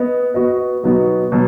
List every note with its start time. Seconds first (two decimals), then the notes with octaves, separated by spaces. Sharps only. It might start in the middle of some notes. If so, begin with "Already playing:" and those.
Already playing: B3 D#5
0.34 B3 F#4 B4 D#5
0.83 B2 F#3 B3 D#4 F#4
1.32 B2 F#3